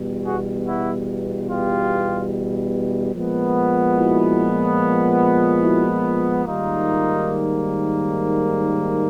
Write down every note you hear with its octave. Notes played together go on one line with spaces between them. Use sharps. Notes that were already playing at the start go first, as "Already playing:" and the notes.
Already playing: E2 B2 G3
F#4 G#4
E4 F#4
F4 G4
A#2 F3 G#3 B3
E4 F#4
E4 F#4
G#2 D#3 G3 A#3 D#4 F4